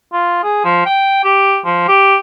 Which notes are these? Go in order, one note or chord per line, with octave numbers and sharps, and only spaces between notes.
F4
G#4
F3
G5
G4
F3
G4